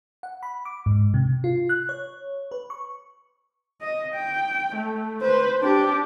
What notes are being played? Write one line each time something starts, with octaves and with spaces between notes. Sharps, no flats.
F#5
B5
D6
G#2
C3
F4
F#6
C#5
B4
C#6
D#5
G5
A3
B4 C5
D4 G4